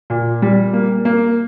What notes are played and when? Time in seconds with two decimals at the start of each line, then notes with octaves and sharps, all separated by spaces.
0.10 A#2
0.42 G3
0.73 A#3
1.05 A#3